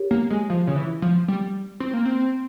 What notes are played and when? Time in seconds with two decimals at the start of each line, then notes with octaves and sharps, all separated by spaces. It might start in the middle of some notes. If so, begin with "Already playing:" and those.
Already playing: G4 A#4 C#5
0.11 A#3
0.31 G#3
0.50 F3
0.67 C#3
0.76 E3
1.02 F3
1.28 G3
1.80 C4
1.94 A#3
2.05 C4